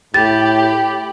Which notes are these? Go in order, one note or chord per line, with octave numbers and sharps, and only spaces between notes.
A2 G4 G5 B5 A6